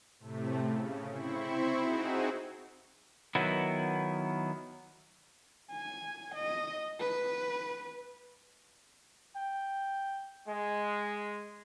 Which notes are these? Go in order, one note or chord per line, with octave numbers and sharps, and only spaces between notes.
A2 C3 A3
C#3
C4 E4 C5 B5 C#6
C4 D#4 E4 F#4 G#4
D#3 F#3 B3 E4
G#5
D#5
B4
G5
G#3